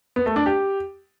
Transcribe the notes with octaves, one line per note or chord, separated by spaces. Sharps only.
B3
A3
D4
G4